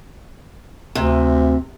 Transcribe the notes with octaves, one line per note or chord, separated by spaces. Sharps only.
D2 C3